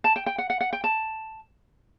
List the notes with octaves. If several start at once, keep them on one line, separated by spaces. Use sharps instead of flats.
A5
G5
G5
F#5
F#5
F#5
G5
A5